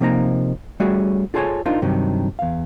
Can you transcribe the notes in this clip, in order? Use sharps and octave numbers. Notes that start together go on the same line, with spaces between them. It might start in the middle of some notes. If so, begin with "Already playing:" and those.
C3 F3 A#3 D#4 F5 A#5
G3 A3 C#4 F#4 G#4
F4 G#4 A4 C5 C#5 G#5
D4 D#4 F4 A#4 C5
G2 C3 D#3 F#3
E2 F5